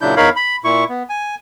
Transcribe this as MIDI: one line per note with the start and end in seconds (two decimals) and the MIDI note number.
0.01 0.15 46
0.01 0.15 49
0.01 0.15 54
0.01 0.15 62
0.01 0.15 64
0.01 0.15 91
0.17 0.29 40
0.17 0.29 63
0.17 0.29 70
0.17 0.29 73
0.17 0.29 77
0.17 0.29 83
0.36 0.56 83
0.64 0.84 46
0.64 0.84 64
0.64 0.84 85
0.89 1.03 59
1.09 1.35 80